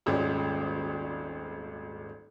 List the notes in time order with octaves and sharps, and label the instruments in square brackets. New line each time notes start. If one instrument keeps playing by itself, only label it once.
[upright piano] D#1 G#1 G#3 C#4 D5